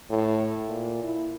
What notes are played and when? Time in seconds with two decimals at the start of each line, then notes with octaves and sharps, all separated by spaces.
0.10 A2
0.68 A#2
1.03 E4